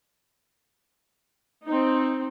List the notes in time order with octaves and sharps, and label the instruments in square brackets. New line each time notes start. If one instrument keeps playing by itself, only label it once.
[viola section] C4 D#4